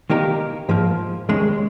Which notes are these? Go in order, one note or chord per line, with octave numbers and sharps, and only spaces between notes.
D#3 A#3 D#4 G4 A#4
G#2 F3 A#3
D#2 C#3 G#3